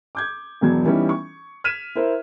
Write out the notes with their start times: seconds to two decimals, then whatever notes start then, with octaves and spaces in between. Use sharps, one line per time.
0.15 D6 G6 G#6
0.61 E1 E2 F#3 G#6
0.84 E3 G3 B3 C#4 D#4
1.09 C#6
1.64 F6 G#6 B6 D#7 E7
1.95 E4 A#4 C5